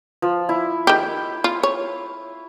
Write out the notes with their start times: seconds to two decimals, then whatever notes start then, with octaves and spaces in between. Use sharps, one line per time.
0.22 F3
0.49 E4
0.87 D#3 G4
1.44 F4
1.63 C#5